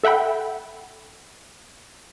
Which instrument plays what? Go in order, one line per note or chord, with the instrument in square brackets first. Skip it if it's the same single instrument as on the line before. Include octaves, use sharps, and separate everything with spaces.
[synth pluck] A4 E5 F#5 G5 B5